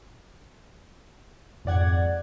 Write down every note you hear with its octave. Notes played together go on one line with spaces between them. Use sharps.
F2 G#2 D5 F#5 G#6